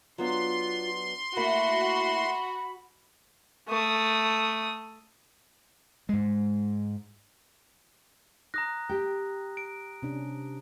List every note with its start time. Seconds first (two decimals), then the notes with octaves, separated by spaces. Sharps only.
0.18 F#3 B3 D4 F4 C6
1.36 A3 A#3 E4 F#4 B5
3.68 A3 D#6
6.09 G#2 G#3
8.54 A#5 D#6 F#6 A#6
8.89 G4 G5
9.57 D7
10.02 C3 C#4 D4